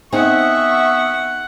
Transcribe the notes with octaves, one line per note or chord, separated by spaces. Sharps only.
B3 C4 D#4 G#4 E5 F#5 C#6